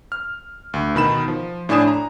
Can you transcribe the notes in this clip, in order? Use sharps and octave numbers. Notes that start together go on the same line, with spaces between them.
F6
D2
B2 D#3 B5 E7
F3
A2 D4 E4 G#5 D#6 E7
A#5